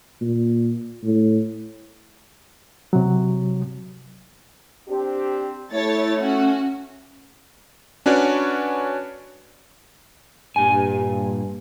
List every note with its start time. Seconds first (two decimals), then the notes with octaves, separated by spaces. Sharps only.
0.21 A#2
1.04 A2
2.93 C3 F#3
4.89 C4 D4 G4
5.73 A3 E4 C#5 A6
6.22 C#4 F#4
8.06 C#4 D4 F#4 B4 C#5 D5
10.56 G2 A#2 G#5